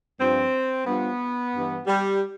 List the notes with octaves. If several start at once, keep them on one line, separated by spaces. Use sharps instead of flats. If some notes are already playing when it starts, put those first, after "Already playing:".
G2 F3 C4
G2 F3 B3
G2 E3
G3